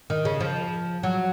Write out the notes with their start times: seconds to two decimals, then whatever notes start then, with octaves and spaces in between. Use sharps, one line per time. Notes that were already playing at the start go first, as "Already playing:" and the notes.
0.10 D#3
0.25 C#3
0.41 F3
1.03 F#3